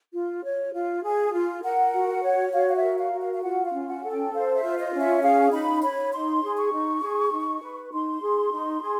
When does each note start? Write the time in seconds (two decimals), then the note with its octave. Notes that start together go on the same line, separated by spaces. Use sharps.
0.14 F4
0.44 C#5
0.73 F4
1.04 G#4
1.34 F4
1.63 A#4 F#5
1.93 F#4
2.23 C#5
2.53 F#4 F5
2.69 F5
2.76 E5
2.83 A#4
2.98 F5
3.13 F#4
3.21 F5
3.34 F5
3.44 F4 F#5
3.65 F5
3.73 C#4
3.88 F#5
4.03 A4
4.11 G5
4.33 C5 F5
4.55 E5
4.63 F4
4.78 D#5
4.93 C#4
5.00 E5
5.23 G#4 F5
5.52 D#4 B5
5.83 C#5 B5
6.12 D#4 C6
6.43 G#4
6.57 C#6
6.73 D#4
7.02 G#4
7.32 D#4
7.62 B4
7.93 D#4 C6
8.22 G#4
8.52 D#4
8.82 G#4